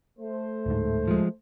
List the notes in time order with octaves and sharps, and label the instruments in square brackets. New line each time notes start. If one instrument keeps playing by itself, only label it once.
[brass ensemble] A3 C5
[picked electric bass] D1 G#2
[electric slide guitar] F3 G#3